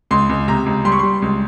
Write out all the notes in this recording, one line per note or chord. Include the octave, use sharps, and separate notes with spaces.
C#2 C6
C#2
C3 A#5
C#2
G3 C6
C#6
G3 C6
C#2